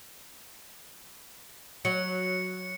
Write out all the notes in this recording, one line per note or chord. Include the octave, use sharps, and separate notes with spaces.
F#3 C#7